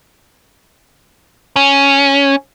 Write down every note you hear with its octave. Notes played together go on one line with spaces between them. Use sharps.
C#4